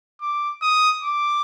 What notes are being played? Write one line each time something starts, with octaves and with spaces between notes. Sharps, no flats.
D6
D#6
D6